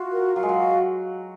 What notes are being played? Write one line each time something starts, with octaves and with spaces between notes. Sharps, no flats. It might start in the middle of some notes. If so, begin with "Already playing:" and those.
Already playing: F4 F#4
A#4
F#3 F5
G#3
F#3
F#4